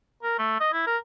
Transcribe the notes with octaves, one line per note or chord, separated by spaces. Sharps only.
A#4
A3
D#5
E4
A#4